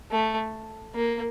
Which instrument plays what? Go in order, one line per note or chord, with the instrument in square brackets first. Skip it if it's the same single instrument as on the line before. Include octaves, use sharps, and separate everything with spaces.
[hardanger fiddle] A3
A#3